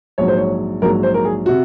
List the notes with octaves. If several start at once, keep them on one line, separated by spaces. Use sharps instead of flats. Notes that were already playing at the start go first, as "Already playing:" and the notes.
A#1 G#2 F#3 C#5
C5
C#5
A#1 G#2 F#3 A#4
C5
A#4
G#4
C3 F#4